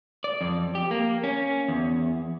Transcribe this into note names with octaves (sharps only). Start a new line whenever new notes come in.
D5
F2
G4
A#3
C#4
E2